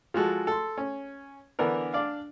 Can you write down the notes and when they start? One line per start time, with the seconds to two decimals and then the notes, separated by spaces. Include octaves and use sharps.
0.14 F3 G#3 F#4 A4
0.47 A4 C6
0.78 C#4
1.59 D3 E3 B3 D4 A#4
1.94 D4 D5 F5